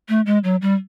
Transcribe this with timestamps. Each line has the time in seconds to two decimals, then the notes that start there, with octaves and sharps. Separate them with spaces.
0.09 A3
0.26 G#3
0.44 F#3
0.61 G3